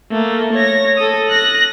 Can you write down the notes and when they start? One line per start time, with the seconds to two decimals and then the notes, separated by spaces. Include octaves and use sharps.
0.11 A3 A#3
0.53 C#5 A#6
0.98 A4 D#6
1.29 F#6 A#6